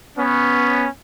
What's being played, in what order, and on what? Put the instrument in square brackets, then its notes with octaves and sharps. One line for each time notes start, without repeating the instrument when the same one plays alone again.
[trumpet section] B3 C#4